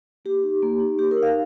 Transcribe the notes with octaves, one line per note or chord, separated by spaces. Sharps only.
A#3 G4
D#4
A#3
D#4
A#3 G4
A#4
D#4
F5